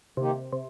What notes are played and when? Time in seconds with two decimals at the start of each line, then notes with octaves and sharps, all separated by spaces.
0.17 C3 D#3 A#3 D#4 G4
0.53 C3